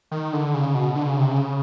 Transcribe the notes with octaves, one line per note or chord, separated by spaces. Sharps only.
D#3
D3
C#3
B2
D3
C#3
C3
C#3